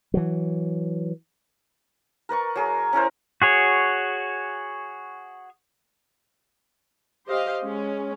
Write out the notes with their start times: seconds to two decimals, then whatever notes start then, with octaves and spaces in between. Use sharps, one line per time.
0.14 E3 F#3
2.29 A#4 B4 D5 C#6
2.56 F#3 G#4 A#4
2.93 C#4 E4 A#4 C5
3.42 F#4 G#4 C#5
7.27 G4 C5 D#5 F5
7.63 G#3 C#4